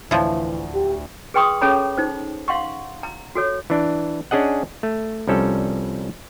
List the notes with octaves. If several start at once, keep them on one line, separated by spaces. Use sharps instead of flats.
D2 A2 E3 F3
G4
G#4 B4 G5 C6 C#6 D#6
C#4 G#4 A4 C#5 A#5 B5
D#4 C5
F5 F#5 C6 C#6
A#5
F#4 A4 C#5
E3 D4
C#4 D4 G#4 D#5 F#5
A3
C2 F3 G3 C#4 A4